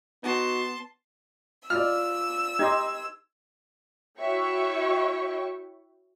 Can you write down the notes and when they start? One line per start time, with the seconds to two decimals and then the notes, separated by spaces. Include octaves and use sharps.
0.23 B3 D#4 F#4 A5 C6
1.70 F4 D5 E6 F6
2.59 D#4 G4 D#5 C6 G#6
4.19 E4 F#4 C#5 E5 G5 C#6